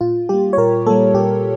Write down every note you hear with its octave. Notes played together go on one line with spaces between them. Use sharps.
A#2 F4
G3 A#3 G4
C#5
A#2 A#4
G3 A#3 A4
A#2 G4